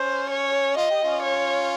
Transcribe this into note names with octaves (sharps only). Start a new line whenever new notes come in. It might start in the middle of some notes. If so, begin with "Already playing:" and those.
Already playing: C#4 C5
C#5
F4 D#5
G4
C#4 F4
C#5